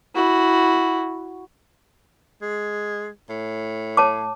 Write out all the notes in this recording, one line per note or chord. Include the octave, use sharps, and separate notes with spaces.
E4 F#4
G#3
A2
C#5 A5 D6